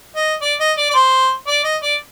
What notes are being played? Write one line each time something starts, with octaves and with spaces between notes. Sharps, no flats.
D#5
D5
D#5
D5
D5
C5
D5
D#5
D5